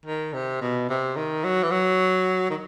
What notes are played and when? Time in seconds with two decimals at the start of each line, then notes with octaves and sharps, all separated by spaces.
0.05 D#3
0.34 C3
0.61 B2
0.89 C3
1.16 D#3
1.44 F#3
1.63 E3
1.71 F#3
2.50 D#3